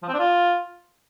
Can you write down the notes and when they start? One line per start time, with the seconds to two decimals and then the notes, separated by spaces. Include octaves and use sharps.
0.03 F3
0.08 C4
0.14 D4
0.19 F4